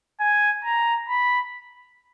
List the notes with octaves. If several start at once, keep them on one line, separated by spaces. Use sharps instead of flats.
G#5
A#5
B5